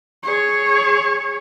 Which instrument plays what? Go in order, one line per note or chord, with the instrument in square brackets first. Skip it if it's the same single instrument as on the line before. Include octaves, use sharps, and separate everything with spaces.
[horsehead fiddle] G#4 C#5